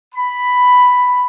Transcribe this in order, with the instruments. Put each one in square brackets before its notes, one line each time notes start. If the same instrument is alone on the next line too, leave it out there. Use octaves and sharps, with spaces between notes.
[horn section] B5